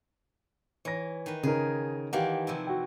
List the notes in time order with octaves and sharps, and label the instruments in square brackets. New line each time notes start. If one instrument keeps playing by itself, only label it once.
[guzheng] E3 [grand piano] C#5 A#6
[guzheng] D#3 B4
[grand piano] C#3 D#4 A#4 [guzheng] G#4
[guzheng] D#3 E3 D5 [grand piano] G4 F5 F#5
[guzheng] C3 F3 E4
[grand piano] F#4 G5